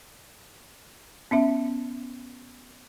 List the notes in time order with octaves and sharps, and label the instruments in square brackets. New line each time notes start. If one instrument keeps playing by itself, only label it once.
[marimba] B3 C#4 E5